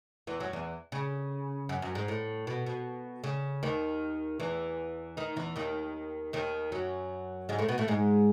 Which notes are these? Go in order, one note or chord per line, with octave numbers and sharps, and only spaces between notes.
E2 E3
F#2 F#3
E2 E3
C#3
F#2
F#2
G#2
A2
B2
B2
C#3
D#2 D#3
E2 E3
D#3 D#4
E2 E3
D#2 D#3
D#2 D#3
F#2 F#3
G#2 G#3
A2 A3
B2 B3
A2 A3
G#2 G#3